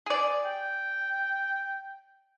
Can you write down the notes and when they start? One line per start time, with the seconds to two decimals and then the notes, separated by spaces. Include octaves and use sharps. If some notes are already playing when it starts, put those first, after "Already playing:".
0.06 G#4 D5
0.45 G5